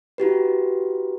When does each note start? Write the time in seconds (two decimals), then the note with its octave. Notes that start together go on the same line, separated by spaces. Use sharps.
0.18 E4 F#4 G4 B4